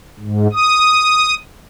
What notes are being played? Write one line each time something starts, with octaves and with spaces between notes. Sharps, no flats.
G#2
D#6